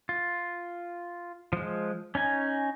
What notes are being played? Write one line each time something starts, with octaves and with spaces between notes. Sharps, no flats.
F4
F3 G#3
C#4 D#4 G#5